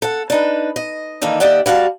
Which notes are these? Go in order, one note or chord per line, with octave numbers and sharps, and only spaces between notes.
A4 F#5
D4 D#4 B4
D#5
D#3 E3 A#3 D4 D#4 A4
D#2 D#4 G4 D5 E5 F#5
G3 F#4 F5 A5